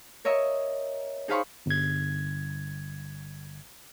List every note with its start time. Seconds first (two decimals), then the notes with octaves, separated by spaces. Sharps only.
0.25 A#4 C#5 D#5 E5
1.28 D#4 G#4 C5 F5 B5 C#6
1.66 G1 G#6